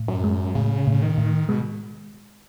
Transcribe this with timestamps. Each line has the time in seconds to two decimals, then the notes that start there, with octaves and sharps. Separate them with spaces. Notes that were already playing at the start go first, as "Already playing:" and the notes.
Already playing: A2
0.08 F#2
0.24 G#3
0.55 A2 C#3
0.87 A2
0.92 C#3
1.02 D#3
1.18 A2
1.49 B2 G#3